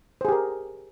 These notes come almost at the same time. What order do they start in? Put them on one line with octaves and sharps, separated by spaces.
C5 G#4 G4 A#4